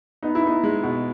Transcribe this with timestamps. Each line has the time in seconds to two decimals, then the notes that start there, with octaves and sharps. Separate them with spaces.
0.23 B3 D#4
0.35 E4
0.43 B3 D#4
0.63 G#3
0.83 B2